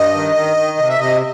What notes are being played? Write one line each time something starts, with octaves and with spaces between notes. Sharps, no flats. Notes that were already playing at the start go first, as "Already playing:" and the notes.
Already playing: G2 D#5
D#3
D#3
D#3
C3
E5
C3 D#5